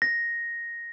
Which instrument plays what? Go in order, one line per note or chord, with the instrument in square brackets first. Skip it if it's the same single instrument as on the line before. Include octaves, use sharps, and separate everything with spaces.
[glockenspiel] A#6